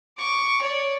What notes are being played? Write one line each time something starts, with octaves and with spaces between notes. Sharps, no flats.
C#6 D6
C#5 D5